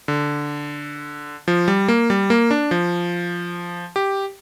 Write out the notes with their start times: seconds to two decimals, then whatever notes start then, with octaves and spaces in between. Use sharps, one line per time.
0.08 D3
1.48 F3
1.68 G3
1.88 A#3
2.10 G3
2.30 A#3
2.51 D4
2.71 F3
3.96 G4